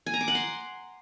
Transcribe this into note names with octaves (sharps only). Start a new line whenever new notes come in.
G#5
A#5
D6
F#5
C6